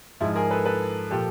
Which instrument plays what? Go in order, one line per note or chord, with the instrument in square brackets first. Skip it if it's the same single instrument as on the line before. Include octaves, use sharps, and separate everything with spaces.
[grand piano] G#2 F3 G#3 E4
G#4 A#4
A4 B4
A4 B4
A#2 F3 G4 A4